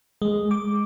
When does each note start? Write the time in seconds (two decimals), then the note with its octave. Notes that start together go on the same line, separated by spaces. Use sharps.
0.22 G#3
0.51 D6